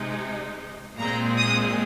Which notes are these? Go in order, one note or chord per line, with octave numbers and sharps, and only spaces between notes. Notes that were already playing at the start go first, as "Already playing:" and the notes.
Already playing: C3 G#3 D#4
A#2 G#3 C4 A#5
D#6